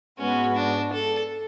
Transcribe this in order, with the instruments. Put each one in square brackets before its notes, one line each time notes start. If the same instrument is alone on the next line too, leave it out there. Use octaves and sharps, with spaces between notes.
[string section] G#2 G#3 B3 F#4 B4 [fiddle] C#4
[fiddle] D4
A4